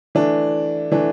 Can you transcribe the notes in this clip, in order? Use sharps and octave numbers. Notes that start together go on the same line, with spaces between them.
E3 A3 D4
E3 A3 D4